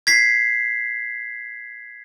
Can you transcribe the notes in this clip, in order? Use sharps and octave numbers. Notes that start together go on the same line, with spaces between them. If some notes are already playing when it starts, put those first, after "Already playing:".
G#6 B6 C7